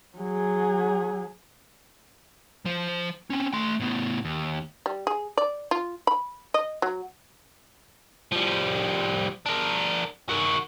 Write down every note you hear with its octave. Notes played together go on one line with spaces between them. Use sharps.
F#3 G#4
F3 C5
C4 C#4
A3 C6
A2 B3
D#2
G3
G#4
D5
F4
B5
D#5
F#3
F3 G3
D4 A#4
D#3 F#4